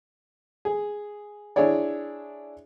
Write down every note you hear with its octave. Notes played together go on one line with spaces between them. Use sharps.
G#4
D4 E4 G#4 C#5 D5